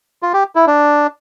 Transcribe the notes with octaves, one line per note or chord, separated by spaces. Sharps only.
F4
G4
E4
D4